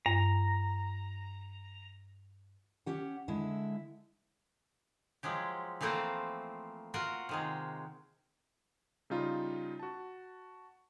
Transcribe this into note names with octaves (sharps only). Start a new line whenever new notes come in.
G2 A#5
C#4 G4 F#5
D3 G#3 E4
F3 F#3 G#3 G4
E3 F3 A3 A#3 C4
F4 F#4 A#4
C3 D#3 G#3
C#3 G3 D#4 F4
F#4 A5